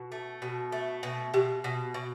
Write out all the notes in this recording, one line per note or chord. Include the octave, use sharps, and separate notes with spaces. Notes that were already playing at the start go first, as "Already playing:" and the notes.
Already playing: B2
A3
B2
A3
B2
B2 G4
B2
B2